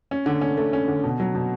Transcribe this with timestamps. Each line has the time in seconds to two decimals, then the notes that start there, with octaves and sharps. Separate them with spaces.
0.11 C#4
0.26 D3
0.41 C#4
0.57 A3
0.73 C#4
0.88 D3
1.03 B2
1.20 F#3
1.35 B2